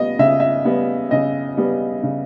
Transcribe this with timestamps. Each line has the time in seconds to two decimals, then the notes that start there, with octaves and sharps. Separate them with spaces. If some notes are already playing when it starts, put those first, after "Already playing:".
Already playing: C#3 G3 B3 D#5
0.19 C#3 E5
0.40 E5
0.65 G3 B3
1.11 C#3 D#5
1.57 G3 B3
2.03 C#3